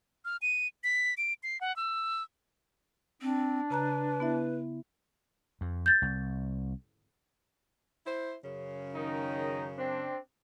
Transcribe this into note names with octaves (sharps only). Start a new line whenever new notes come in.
F6
D#7
B6
D7
C7
F#5
E6
C4 D4
C#3 B4 A#5 F#6
B3 E4 E5
F2
G6 A6
C2
E4 C5
F#2 C#3
D#3 D#4
C4 D4